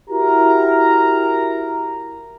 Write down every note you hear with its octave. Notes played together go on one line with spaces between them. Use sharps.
E4 F#4 G4 A#4 A#5